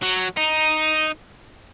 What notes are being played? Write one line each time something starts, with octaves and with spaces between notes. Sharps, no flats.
F#3
D#4